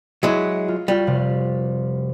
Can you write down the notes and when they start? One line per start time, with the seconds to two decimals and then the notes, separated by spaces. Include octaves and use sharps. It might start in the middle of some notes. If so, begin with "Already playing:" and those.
0.23 F#3 G#3 E4
0.68 F4
0.88 G3 F4 F#4
1.07 F1 C3 F5